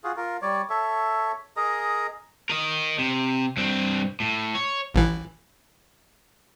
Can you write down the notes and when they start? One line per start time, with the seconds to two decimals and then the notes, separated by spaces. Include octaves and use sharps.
0.04 F4 F#4 G#4
0.17 F4 A#4
0.42 G3 C#5 D5
0.70 A4 C#5 E5
1.57 G#4 A#4 D#5 A#5
2.50 A#4 D#5
2.98 C3
3.57 G2 C4
4.20 A2
4.55 C#5
4.94 A1 E3